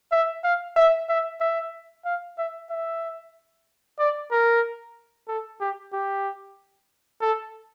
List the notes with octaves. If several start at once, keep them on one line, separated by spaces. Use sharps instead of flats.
E5
F5
E5
E5
E5
F5
E5
E5
D5
A#4
A4
G4
G4
A4